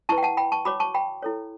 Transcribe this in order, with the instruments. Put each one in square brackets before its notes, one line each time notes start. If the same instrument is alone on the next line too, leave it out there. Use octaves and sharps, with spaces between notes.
[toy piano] E4 B4 A5 C#6
G5
F#5 A5
G5 B5
A5 C#6
F#4 C#5 B5 D6
A5 C#6
G5 B5
E4 A4 C#5